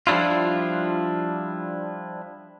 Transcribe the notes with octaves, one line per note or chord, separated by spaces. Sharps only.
F3 G3 D4 E4 F4